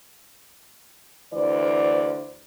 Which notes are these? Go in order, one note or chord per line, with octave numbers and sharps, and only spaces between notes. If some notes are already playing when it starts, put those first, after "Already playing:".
D2 E3 C5 D5